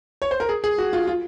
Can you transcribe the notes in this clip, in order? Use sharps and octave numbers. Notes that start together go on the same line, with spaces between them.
C#5
C5
A#4
G#4
G#4
F#4
F4
F4